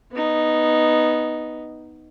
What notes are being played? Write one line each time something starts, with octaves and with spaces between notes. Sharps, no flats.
B3 D#4